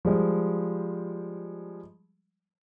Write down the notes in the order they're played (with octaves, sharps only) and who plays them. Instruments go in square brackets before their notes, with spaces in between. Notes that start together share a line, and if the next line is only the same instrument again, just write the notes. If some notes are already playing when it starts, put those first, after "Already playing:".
[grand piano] F3 G3 G#3